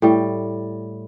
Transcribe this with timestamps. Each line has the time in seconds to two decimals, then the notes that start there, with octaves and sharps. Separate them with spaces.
0.02 A2 G3